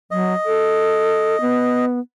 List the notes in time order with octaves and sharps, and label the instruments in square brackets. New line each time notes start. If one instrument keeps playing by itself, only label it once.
[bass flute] F#3 [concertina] D#5
[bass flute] A4
B3